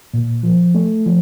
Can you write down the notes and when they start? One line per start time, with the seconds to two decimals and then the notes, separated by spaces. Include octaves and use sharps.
0.14 A#2
0.43 F3
0.75 A3
1.06 F3